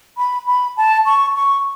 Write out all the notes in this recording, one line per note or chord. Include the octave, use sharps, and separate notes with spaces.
B5
B5
A5
C#6
C#6